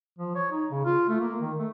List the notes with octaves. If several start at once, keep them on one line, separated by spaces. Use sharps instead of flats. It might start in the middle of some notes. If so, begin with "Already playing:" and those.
F3
C#5
D#4
C#3
F4
A3
A#3
D#3
A3